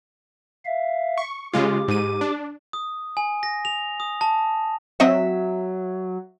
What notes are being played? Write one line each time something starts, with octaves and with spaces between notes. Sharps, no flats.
E5 F5
C#6
C#3 G#3 F4 G4 D6
G#2 D#7
D4
D#6
G#5
A#6
F7
D#6
A5
F#3 C4 D#5 E5 C#6